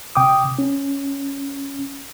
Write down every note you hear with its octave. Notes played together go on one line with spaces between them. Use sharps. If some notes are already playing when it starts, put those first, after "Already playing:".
C3 G5 D6 D#6
C#4